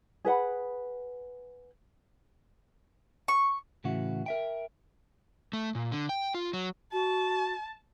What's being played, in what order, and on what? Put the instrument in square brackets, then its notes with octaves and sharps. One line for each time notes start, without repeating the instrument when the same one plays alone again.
[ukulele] G#4 B4 F#5 B5
[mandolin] C#6
[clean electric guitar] A2 C#3 E3 E4 F#4
A#4 E5 G5
[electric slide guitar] A3
A#2
D3
G5
F4
F#3
[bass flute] F#4 [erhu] A5